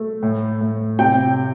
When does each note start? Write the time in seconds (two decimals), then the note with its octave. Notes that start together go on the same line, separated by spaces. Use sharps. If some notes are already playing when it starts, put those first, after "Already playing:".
Already playing: A3
0.22 A2
0.61 A2
0.99 C3 G5